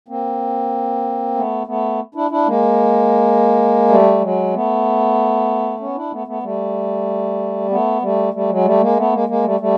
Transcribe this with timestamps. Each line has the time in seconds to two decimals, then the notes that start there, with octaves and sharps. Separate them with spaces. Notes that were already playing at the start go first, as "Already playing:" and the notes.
0.08 A#3 C4
1.35 A3 B3
1.67 A3 B3
2.15 D4 E4
2.30 D4 E4
2.46 G#3 A#3
3.89 G3 A3
4.21 F#3 G#3
4.53 A3 B3
5.80 B3 C#4
5.95 D4 E4
6.12 A3 B3
6.27 A3 B3
6.43 G3 A3
7.70 A3 B3
8.02 G3 A3
8.34 G3 A3
8.50 F#3 G#3
8.65 G3 A3
8.81 G#3 A#3
8.97 A3 B3
9.13 G#3 A#3
9.28 G#3 A#3
9.44 G3 A3
9.60 G3 A3